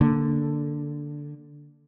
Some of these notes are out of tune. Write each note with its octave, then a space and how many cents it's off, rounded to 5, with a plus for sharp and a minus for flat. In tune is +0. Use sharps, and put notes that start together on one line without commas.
D3 +0 A#3 +0